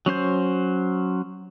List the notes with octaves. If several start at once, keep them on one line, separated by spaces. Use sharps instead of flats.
F#3 C#4 C5 G6